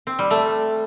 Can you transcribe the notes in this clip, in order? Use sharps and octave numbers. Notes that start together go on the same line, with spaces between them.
C4
G3
A3